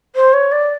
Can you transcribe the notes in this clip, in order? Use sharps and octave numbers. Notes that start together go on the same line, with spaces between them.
C5
C#5
D5